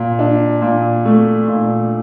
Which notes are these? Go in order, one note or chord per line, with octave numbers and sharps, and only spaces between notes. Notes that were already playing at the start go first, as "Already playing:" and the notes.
Already playing: A#2
D4
A#2
A3
A#2